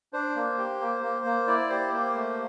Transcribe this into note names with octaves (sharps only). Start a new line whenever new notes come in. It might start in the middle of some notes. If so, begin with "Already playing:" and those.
D4 C5
A#3
G4
A#3
A#3
A#3
E4 D5
G4 C5
A#3 C5
A3